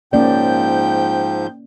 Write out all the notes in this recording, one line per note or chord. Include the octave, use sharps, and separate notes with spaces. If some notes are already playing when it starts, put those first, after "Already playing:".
G#2 F3 A#3 C#4 D5 G5 G6